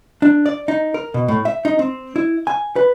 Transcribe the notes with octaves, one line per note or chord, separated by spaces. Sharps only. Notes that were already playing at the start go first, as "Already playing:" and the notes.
D4
D5
D#4
A#4
B2
A2
E5
D#4
C4
E4
G#5
B4